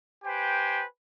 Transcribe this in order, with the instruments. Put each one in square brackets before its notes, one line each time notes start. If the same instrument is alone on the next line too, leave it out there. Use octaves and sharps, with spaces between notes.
[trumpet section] G4 B4 C5 G5 G#5